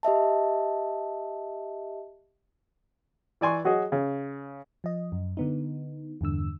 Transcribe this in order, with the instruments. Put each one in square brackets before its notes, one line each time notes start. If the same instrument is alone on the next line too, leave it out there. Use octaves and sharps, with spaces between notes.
[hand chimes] G4 D#5 E5 A5
[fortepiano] E3 D5 G#5 C6 C#6
F#3 F#4 G#4 D#5
C#3
[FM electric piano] F3 D#5
F#2
D3 B3 D#4
E2 G2 D3 E6